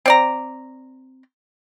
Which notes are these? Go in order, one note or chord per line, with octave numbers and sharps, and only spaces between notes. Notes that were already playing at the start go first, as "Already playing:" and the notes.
C4 D5 A#5